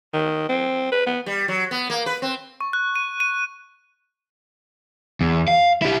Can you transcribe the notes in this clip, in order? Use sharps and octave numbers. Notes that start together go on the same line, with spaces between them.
D#3
C4
B4
B3
G3
F#3
B3
A#3
B4
C4
C#6
F#6
D#7
D#7
E2
F5
E4 G4